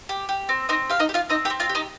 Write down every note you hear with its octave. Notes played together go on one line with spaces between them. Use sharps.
G4
G4
C4
C4 D#4 D#5
G4 F5
D#4 D#5
G4
F4 F5
C4 D#4 D#5
G4 G5
C4
F4 F5
G4
D#4 D#5